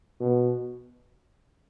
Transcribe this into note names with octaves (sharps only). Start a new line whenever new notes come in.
B2